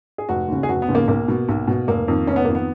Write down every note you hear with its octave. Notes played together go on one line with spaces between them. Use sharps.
G#4
F1 F#4
D#2 C#3
G#4
F1 F#4
B3
D#2 C#3
A#3
B1 A#3
B2
B1
B2
F1 A#3
F2 D#3
F1 C#4
B3
F2 D#3 A#3
B3